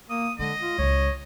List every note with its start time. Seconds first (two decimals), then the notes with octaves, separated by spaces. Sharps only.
0.10 A#3 D#6
0.39 D3 G#3 D#5
0.61 F4
0.78 C#2 F#2 C#5